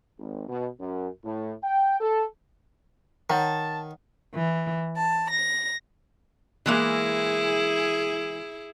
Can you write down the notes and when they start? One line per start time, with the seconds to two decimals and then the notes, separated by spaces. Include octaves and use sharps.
0.19 G#1
0.49 B2
0.80 F#2
1.25 A2
1.64 G5
2.01 A4
3.30 D#3 C#5 F#5 A5 A#5
4.34 E3
4.96 A5
5.31 A#6
6.66 E3 G#3 A#3 E4 G#4